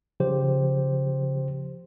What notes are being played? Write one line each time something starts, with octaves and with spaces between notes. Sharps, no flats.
C#3 F3 G4 C5